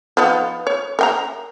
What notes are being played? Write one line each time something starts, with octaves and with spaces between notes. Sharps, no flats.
F3 B3 D#4
C#5
A#4 G5 A#5